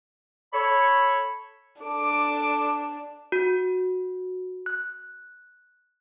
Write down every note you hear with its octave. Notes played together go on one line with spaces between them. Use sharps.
A4 C#5 B5
D4 A4 D6
F#4
F#6